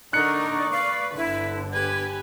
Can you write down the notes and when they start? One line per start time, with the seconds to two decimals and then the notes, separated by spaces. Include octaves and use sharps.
0.13 D3 D4 D#4 A#4 D5 C#6 F#6 C#7
0.71 B4 F5
1.17 G1 D3 E4
1.73 G4 B4 G#5 G#6